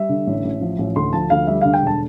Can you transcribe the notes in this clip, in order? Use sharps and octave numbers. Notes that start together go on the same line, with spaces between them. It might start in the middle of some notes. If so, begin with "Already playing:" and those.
Already playing: G3 E5
D3
A1
A1
F3
A1
D2 C6
F3 A5
D2 F5
G3 E5
D3 F5
G5
E1 A5